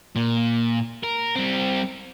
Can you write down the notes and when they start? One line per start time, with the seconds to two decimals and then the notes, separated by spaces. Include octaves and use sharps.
0.16 A#2
1.04 A#4
1.35 G3 C4